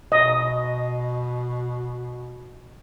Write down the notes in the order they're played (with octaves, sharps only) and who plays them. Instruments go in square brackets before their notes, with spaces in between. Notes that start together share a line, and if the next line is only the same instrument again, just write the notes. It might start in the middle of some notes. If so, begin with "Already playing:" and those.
[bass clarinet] B2 [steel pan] D#5